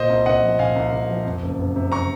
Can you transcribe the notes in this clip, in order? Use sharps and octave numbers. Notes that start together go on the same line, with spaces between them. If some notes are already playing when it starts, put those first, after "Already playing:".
Already playing: A#2 C5 D#5
C2
C2 D#5 F#5
F3
A#2 F5 G#5
C2
C2
F3
F2
F#1
F#1
C3
A#5 C#6